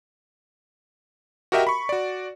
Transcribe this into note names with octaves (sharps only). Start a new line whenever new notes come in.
F#4 G4 A#4 D#5 E5 G5
B5 C#6
F#4 D5